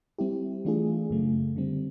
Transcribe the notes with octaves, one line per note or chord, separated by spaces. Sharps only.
G3 C4 E4 G4
E3 A3 D4 F4 G#4
F#2 C#3 F#3 A3
D3 G3 C4